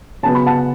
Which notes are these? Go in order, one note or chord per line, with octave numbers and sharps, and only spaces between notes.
C#3 F#3 B3 A5
B5
F#5 A5